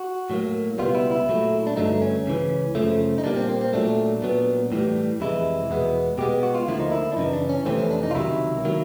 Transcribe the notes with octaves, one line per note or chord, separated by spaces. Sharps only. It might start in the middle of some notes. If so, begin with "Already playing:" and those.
Already playing: F#4
A2 F#3 A#3
C#2 B2 G3 B3 F4
E4
E4
A#2 F#3 A3
D4
G2 D3 F#3 A3 D#4
C#4
C#2 C#3 E3
F#2 C#3 F3 A3
D#4
A#2 G3 A#3 D4
C4
C4
C4
A#2 F#3 A3 D4
A#2 F#3 B3
A2 E3 G3
F2 C3 E3 G#3 E4
E2 B2 G#3 B3
B2 G#3 B3 G4
F#4
F4
D2 D3 F3 A#3 E4
D#4
E4
D4
F#2 C#3 E3 D#4
D4
C#4
F2 C3 E3 A3 C4
C#4
D4
D#4
F4
C#2 C3 D#3 F#3 E4
D#3 F#3 A#3